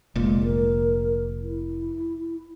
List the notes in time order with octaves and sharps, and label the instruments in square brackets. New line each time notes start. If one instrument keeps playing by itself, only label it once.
[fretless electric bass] F1 A#2 [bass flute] G#3
[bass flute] A#4
E4